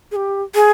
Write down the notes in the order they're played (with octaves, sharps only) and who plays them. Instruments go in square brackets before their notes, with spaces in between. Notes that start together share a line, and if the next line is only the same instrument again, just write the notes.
[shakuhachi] G#4
G4
G#4